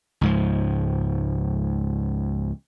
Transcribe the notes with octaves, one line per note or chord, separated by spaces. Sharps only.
C#2 G#2 F3